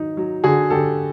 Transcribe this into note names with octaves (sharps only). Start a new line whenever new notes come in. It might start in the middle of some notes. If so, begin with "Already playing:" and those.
Already playing: D#3 F#3 D#4
F#3
D3 F#4 G#4
D3 G4 A4